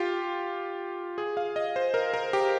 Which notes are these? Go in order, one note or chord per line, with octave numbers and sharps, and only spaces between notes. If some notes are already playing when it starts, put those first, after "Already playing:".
Already playing: F4 G4
G#4
F5
D#5
C5
A#4
A#4
G4